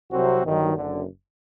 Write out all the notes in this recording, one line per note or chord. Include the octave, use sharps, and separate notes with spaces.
C2 C3 F#3 C4 F#4
G1 G2 D#3 F#3
F#1 F#2 D3